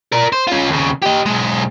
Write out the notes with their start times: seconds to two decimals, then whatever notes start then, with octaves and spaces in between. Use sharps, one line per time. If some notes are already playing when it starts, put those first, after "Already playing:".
0.12 A#4 D5
0.32 C5
0.47 C#4 F4
0.70 D#2 C#3
1.02 G4 D#5
1.26 B1 G#3